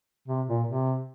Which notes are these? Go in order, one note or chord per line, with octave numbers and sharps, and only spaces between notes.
C3
A#2
C3